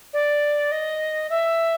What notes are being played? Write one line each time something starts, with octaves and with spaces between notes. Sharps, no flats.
D5
D#5
E5